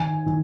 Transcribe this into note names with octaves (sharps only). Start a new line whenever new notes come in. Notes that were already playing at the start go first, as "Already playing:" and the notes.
Already playing: D#3 G#5
D#3